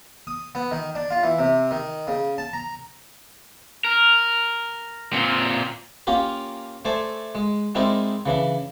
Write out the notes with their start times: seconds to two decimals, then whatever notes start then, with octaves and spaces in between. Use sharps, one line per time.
0.27 D#6
0.55 B3
0.71 D#3
0.95 D4
1.11 F4
1.23 E3
1.39 C3
1.71 D#3
2.07 C#3
2.38 A5
2.53 A#5
3.85 A#4
5.13 A#2 C4
6.07 A#3 C#4 F4 G4 A#4
6.85 A3 C5 D5 G#5 A5
7.35 G#3
7.75 G#3 C4 D#4 E4 A#4 D5
8.26 C#3 E3 D4